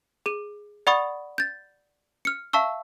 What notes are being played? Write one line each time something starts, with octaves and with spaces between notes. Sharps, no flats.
G#4 D#7
D5 F#5 B5 C#6 D#6 A6
G6 A6
F6 C#7
E5 F5 A5 C#6 E6